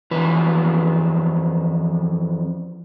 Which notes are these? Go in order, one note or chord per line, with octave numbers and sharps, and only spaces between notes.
F2 E3 F#4 B4